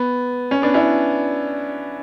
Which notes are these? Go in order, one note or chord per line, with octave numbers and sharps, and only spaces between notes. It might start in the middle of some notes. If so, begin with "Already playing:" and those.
Already playing: B3
C#4
B3 D4
C#4 E4